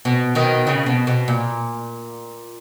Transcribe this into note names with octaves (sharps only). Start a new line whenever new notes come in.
B2
B2 D#3
C#3
B2
B2
A#2